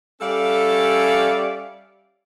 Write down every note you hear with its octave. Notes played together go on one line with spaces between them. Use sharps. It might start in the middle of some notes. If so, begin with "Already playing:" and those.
G3 C#4 A4 D5 E5 F5